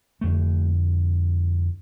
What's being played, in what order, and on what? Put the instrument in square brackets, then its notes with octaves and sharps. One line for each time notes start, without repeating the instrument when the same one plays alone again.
[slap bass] F1 F2 D3 A3